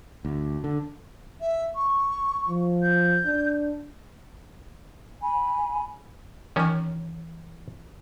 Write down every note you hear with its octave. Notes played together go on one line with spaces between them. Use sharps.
D2
D3
E5
C#6
F3
G6
D4
G#5 B5
D#3 E3 C#4 C#5 C#6